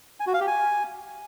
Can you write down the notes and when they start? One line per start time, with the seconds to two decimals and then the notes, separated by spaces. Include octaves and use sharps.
0.20 G#5
0.27 F#4
0.34 F5
0.40 G4
0.47 G#5